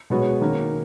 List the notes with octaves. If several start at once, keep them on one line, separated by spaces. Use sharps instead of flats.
B2 G#3 B3 F#4 C#5
D#3 A#3 C#4